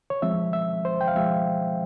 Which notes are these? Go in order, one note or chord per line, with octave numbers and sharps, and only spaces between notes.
C#5
F3 G#3 C4 E5
E5
C5
G5
F5
F3 G#3 C4 E5